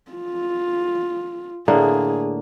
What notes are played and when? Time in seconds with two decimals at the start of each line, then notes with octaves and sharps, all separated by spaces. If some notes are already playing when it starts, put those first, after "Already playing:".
0.11 F4
1.68 A2 D3 A#3 G#4